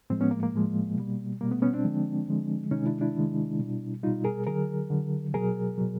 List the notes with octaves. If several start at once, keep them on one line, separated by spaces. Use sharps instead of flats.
A2 F3 G#3 C4
B3 C#4
A#3
A#3
A2 F3 G#3
B2 G3
B2 G3 A#3
A3 B3
B3 C#4
C4 D4
D3 F3 G#3
D3 F3 G#3
C3 D#3 G#3 C#4 D#4
D4 E4
D4 E4
C3 D#3 G#3
B2 G3
B2 G3 D#4 F4
G#4 A#4
D3 F#3 G#4 A#4
D3 F#3
B2 F#3 G#4 A#4
B2 F#3